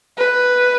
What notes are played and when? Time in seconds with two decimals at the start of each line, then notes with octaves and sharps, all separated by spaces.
0.18 B4